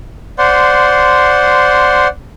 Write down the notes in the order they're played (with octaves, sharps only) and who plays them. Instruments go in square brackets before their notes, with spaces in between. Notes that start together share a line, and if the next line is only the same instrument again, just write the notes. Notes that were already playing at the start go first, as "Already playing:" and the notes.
[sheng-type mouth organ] C5 D5 F#5 C6